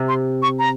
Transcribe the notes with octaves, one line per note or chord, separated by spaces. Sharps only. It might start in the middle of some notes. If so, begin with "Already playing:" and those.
Already playing: C3
C6
C#6
A#5